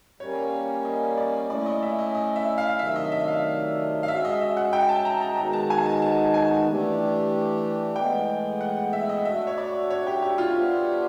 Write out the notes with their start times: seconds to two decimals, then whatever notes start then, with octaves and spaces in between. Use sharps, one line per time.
0.20 G3 A#3 C#4 C#5
0.85 D#5
1.18 D5
1.50 A3 C#4 E4 D5
1.66 D#5
1.82 E5
1.99 D#5
2.15 D#5
2.36 E5
2.58 F5
2.79 C3 D#3 F#3 A3 D4 E5
2.96 D#5
3.12 E5
3.28 F5
4.03 F5
4.08 G#3 C#4 F#4 E5
4.25 D#5
4.41 E5
4.57 F#5
4.73 G5
4.89 A5
5.05 A#5
5.21 A#5
5.38 D#3 G#3 B3 D#4 F#4 A#5
5.53 A5
5.70 G#5
5.86 A5
6.02 A5
6.34 G#5
6.67 E3 A3 D4 G4
7.96 A2 E3 G#3 B3 G5
8.61 F#5
8.93 E5
9.09 D#5
9.25 A3 D4 F#4 E5
9.47 C#5
9.58 D5
9.90 C#5
10.07 G4
10.22 G4
10.38 F4
10.55 G3 B3 D4 G4 C5